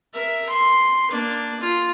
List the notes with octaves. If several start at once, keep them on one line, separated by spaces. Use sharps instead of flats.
A#4 E5
C6
A#3 D4
F4